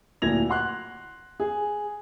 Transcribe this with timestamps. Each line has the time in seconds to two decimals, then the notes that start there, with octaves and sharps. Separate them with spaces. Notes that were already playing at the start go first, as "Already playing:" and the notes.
0.22 D1 A#2 E4 G#6 A#6 F7
0.49 F#5 C6 F#6
1.40 G#4